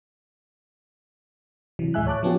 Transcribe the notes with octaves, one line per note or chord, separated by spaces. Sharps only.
C3 E3 F#3
D2 A2 G#3 E5 G#5 F#6
C#5 A5 D6 F#6
F3 F#3 B3 C#4 F4 G4